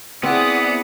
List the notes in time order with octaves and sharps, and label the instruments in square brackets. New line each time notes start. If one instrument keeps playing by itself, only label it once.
[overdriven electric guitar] B3 [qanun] C4 [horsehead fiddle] E4 G#4 [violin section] D5 F#5 D#6